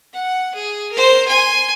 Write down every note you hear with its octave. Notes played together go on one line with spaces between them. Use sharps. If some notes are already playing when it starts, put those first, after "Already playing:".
F#5
G#4
A#4 C5
G#5 C6